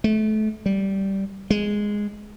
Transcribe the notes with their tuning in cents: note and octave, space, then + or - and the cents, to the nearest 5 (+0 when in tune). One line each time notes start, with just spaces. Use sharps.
A3 -30
G3 -10
G#3 -5